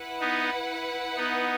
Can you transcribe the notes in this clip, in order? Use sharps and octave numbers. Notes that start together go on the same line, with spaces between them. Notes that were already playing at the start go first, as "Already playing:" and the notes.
Already playing: E4 B4 F#5
B3 D#4
B3 D#4